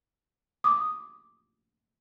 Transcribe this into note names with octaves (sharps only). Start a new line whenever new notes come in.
D6 D#6